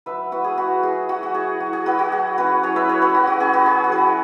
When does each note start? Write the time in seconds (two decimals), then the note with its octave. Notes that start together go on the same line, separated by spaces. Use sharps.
0.06 F#3 B4 E5
0.32 E4 F#4 B4
0.44 G#4
0.57 F#3 F#4 B4
0.83 E4 G#4
1.09 F#3 F#4
1.23 F#4
1.34 E4 G#4
1.60 F#3 F#4
1.73 G#4
1.86 E4 F#4 B4
1.99 F#4
2.12 F#3 G#4
2.38 C#4 E4 F#4 B4
2.63 F#3 G#4 C#5
2.76 B4 E5
2.89 C#4 E4 G#4 C#5
3.02 F#4 B4
3.14 F#3 F#4
3.27 F#4
3.40 C#4 E4 G#4
3.53 F#4 B4
3.66 F#3 G#4
3.84 G#4
3.92 C#4 E4 F#4 B4